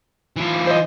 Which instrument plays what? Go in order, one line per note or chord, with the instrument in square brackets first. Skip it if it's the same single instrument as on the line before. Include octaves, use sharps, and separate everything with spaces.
[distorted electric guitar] E3 F4
[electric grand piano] C5 D#5